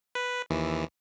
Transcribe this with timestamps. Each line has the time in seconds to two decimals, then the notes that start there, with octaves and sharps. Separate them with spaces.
0.15 B4
0.50 D#2 E3